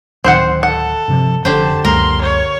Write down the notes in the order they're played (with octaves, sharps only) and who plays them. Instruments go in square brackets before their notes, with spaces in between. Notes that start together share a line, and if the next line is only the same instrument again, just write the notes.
[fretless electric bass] D1 D#3 [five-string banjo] C4 C5 F#5
[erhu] A4 [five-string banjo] F#5
[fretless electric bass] G2 C3 F3
[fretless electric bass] F1 [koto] D3 G4 C5 [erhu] A5
[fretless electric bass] C#2 F#2 A#3 [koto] A#4 [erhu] C6
[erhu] C#5